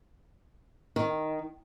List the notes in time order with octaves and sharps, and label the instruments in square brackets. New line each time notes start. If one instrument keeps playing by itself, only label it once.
[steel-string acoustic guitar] D#3